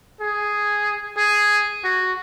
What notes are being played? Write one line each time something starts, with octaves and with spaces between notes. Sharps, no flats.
G#4
G#4
F#4